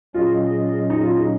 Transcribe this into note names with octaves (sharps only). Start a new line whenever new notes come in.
A#2 F#3 C#4 F4 G#4 D#5
D#4
F4
D#4